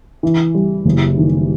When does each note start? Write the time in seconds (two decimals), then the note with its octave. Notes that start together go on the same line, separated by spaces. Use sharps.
0.23 E3
0.54 G3
0.85 F#1
1.17 D#3